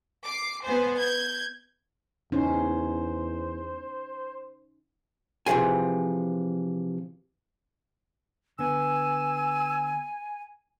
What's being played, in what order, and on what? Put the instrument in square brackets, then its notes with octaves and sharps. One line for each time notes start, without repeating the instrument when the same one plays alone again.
[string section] D6 C7
B3 C5 G#5
G6 G#6
[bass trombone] E2 [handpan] C#4 D#4 [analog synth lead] C5
[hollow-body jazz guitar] C3 E3 F3 G#4 G#5
[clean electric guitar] D3 B3 [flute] G#5 [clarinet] E6